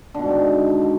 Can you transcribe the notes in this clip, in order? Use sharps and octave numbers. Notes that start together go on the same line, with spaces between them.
G#2 B2 D3 D#3